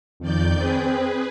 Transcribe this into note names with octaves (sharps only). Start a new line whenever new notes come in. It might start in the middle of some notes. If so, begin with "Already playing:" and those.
F2 D#3 D5 G6
C4 G#4 B4